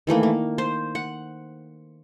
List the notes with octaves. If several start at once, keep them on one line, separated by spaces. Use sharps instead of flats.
D#3 E3 A3 A#3
A#3
C5
F#5